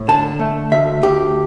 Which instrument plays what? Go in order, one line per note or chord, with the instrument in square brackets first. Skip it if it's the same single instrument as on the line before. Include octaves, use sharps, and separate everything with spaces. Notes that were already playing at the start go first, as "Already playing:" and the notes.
Already playing: [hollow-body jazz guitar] A2
D3 A5
A3
D2 E5
D2 G4